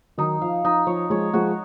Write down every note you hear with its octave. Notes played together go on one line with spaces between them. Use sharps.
D#3 F#3 D#4
F3 F5
F3 D#4
F3 C#5
F3 G#3 C#5
F3 G#3 F#4